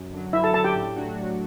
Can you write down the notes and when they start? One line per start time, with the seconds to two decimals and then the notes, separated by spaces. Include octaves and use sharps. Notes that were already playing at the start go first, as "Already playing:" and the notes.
Already playing: F#2
0.13 D3 F#3
0.33 F#2 E4 E5
0.44 A4 A5
0.54 D3 F#3 A4 A5
0.64 G4 G5
0.75 A2
0.96 F#3 A3 D4 F#4
1.16 A2